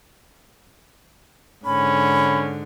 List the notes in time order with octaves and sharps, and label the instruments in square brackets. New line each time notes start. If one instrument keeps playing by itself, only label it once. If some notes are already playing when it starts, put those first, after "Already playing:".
[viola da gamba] G#2 D3 [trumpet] C#4 [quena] B5